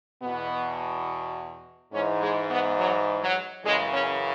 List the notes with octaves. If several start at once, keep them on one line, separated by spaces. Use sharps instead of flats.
E2 B2 B3
G#2 E3 C#4
G#3
B3
F#3
F#3
F#2 C#3 E3 G#3
C#4